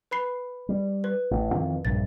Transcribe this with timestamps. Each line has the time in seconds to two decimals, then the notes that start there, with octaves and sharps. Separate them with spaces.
0.11 B4 B5 C7
0.69 G3
1.04 B4
1.31 A1
1.55 F2 D#3 E3
1.85 A#1 G2 A6